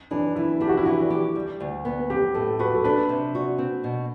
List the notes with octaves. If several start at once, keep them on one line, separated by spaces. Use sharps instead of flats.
E3 D4
E3 E4
D4 G4
F#4
E4
E3 F#4
G4
G3
D2
B3
C4 G4
A2 A4
F#4 B4
A4
D4 B4
C3
F#4
C4
B2